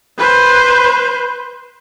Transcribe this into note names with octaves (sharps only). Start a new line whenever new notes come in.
B4 C5